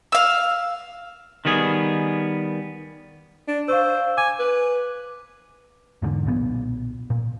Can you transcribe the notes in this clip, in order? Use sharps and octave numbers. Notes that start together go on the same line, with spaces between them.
F5 E6
D#3 G3 B3 G#4
D4
C5 F5 C#6 E6
G#5 D6
B4
E2 G#2 D3
B1 A#2 B3
A#2